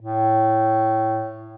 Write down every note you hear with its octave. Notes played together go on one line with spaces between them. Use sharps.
A2